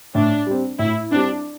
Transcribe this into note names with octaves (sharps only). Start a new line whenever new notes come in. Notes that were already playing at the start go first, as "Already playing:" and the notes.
A2 D4
G3 C4
A2 E4
G3 C4 D4